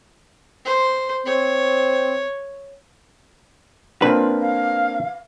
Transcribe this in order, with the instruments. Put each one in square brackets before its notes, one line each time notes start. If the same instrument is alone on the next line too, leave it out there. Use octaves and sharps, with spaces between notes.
[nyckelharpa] C5
[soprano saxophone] C4 [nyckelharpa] C#5
[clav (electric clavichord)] A#3 C4 D4 [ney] F4 [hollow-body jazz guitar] B4
[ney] F5